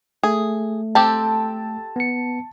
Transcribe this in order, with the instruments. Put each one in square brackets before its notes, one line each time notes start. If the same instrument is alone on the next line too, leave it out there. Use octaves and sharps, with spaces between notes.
[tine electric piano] A3 [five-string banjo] G#4
[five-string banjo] C4 G4 A4 [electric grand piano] A5
[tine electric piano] B3 C#7